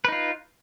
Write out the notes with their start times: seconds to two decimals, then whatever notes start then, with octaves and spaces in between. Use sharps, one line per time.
0.05 B4
0.08 D#4
0.12 F4